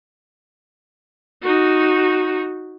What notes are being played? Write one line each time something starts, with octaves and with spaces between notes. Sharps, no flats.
D#4 F#4